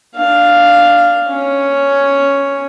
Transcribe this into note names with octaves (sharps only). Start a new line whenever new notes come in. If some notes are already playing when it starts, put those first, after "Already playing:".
D4 F5
C#4